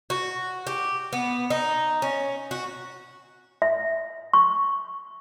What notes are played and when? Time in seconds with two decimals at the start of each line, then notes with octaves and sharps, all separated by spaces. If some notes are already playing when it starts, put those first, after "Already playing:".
0.10 F#4
0.67 G4
1.13 B3
1.50 D#4
2.02 C#4
2.51 F#4
3.62 E5
4.33 C#6